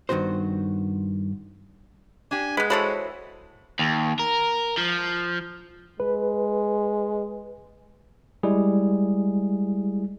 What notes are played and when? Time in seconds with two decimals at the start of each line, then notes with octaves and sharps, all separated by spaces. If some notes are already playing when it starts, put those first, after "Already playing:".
0.09 G2 D#3 B3 F#4 C5
2.31 D4 G4 G#5
2.57 G#3 B3 B4
2.70 E3 F#4 A4 C5 C#5 B5
3.79 D#2
4.19 A#4
4.77 F3
6.00 G#3 B4
8.43 G3 G#3 E4 G#4